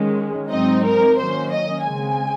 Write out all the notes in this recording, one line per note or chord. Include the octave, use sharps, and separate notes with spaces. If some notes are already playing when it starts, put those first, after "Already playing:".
Already playing: D#3 G#3 C#4
G#2 F#3 C4 D#4 D#5
A#4
D#3 F#3 A#3 C#4 C5
D#5
C#3 G#3 C4 G#5